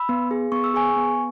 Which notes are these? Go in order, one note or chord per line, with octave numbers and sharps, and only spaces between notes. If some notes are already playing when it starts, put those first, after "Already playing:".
Already playing: B5 E6
B3
G#4
B3 C#6
E6
G#4 G#5 C#6
B3